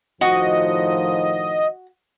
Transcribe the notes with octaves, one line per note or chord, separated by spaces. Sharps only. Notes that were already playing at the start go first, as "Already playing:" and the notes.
A2 D#3 F3 F#4 D#5